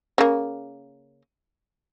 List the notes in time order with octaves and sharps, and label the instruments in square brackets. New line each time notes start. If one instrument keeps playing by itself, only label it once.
[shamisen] C#3 A#3